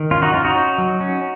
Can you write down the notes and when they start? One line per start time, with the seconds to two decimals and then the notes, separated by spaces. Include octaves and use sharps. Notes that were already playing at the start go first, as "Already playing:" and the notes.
Already playing: D#3
0.11 C#4 F4
0.22 D#4 F#4
0.34 C#4 F4
0.45 D#4 F#4
0.56 C#4
0.78 F#3
1.00 C#4